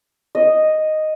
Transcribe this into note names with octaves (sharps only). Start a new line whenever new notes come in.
D#5